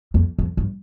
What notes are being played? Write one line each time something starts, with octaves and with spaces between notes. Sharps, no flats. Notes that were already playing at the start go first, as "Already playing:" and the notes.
F2
F2
G2